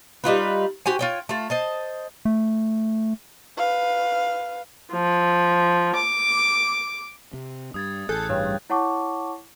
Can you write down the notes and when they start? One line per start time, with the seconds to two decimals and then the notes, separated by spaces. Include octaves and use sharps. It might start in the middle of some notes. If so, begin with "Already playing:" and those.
0.24 G3 D#4 F4 B4
0.86 F#4 G4 C5 G#5
0.99 F4 C#5 G5
1.29 A3 F4
1.50 C5 D#5 A5
2.25 A3
3.58 B4 F5
4.92 F3
5.95 D6
7.33 C3
7.74 G2 D#6 G#6 A6
8.09 A1 G#4 A4 F#6 G6
8.29 G2 C#3
8.70 E4 C#5 F#5 A5 C#6 D6